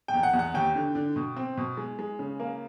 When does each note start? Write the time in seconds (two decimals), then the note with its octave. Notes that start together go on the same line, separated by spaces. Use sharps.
0.08 G5
0.14 E2
0.23 F#5
0.33 E2
0.39 F#5
0.54 D#2 G5
0.75 D3
0.95 D3
1.16 B2
1.36 C4
1.57 B2
1.77 G#3
1.99 G#3
2.19 C#3
2.40 A#3